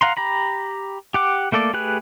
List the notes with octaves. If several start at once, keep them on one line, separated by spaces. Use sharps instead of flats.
F5 F#5 A#5 C6
G4 A#5 B5
G4 F#5 D6
A3 A#3 A4 D5
A3 G4 G#4 B4 F#6